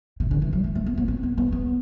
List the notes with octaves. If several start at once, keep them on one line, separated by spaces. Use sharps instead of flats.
C3
D3
E3
F#3
A3
A3
B3
B3
C4
B3
B3
B3